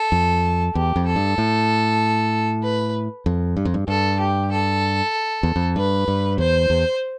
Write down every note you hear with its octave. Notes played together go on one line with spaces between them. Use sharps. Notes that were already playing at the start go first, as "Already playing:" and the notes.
Already playing: A4
F2
E2 G4
F2
A4
G2
A2
B4
F2
G2
F2
G2
G2 A4
G4
A4
E2
F2
G2 B4
G2
E2 C5
E2